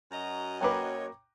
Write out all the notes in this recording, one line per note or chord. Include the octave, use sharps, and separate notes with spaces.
F#2 F#4 D#5 A#5
F#3 A#3 B4 C#5 G5 A#5 D6